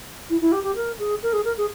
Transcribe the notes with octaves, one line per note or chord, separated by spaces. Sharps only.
E4
E4
G4
G4
A#4
G#4
A#4
G#4
A#4
G#4